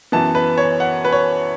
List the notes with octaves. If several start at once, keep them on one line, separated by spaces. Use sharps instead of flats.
F#2 E3 B3 A5
B4
C#5
F#5
B4
C#5